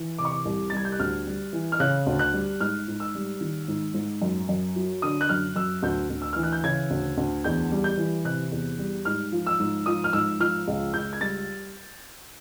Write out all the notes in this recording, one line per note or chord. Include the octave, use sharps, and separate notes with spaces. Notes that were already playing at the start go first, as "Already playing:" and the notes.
Already playing: E3
C3 D6
C#6
D6
C2
A6
G3 G#6
G6
F#6
D2 F6
G3
E3
F6
C#3 F#6
D2
F#6
G3
G#2 F6
G#2
E6
G3
D#3
G#2
G#2
F#2
F#2
F#3
D3 D#6
F#6
F#2 F6
F#2 E6
D2 G6
D2
E6
E3 F6
F#6
G6
C#3 G#6
D2
D2
E2 G6
G3
G6
E3
C3 F#6
E2
G3
G#2 F6
F3
E6
G#2
F3 D#6
F6
G#2 E6
F3 F6
C#2
C#2 G6
G#6
G3 A6